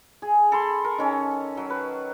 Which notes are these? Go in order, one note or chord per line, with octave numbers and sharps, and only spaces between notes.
G#4
A4 B5 C6
A#4
D#3 C#4 A4
F#3
B4